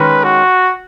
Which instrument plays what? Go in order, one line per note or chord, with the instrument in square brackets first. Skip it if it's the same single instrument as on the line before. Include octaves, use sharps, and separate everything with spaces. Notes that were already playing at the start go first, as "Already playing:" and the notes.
Already playing: [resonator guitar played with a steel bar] D#3 G#3 C#4 [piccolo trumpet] B4
[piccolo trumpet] F#4